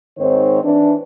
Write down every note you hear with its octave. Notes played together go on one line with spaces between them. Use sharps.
G#2 D#3 C4 C5 C#5
E3 D4